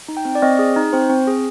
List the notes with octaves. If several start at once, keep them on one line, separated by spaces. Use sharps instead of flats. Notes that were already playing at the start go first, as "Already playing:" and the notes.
D#4
G5
C4
D5
C4 D#5
G#4
D#4
C4 C5
C4
G#4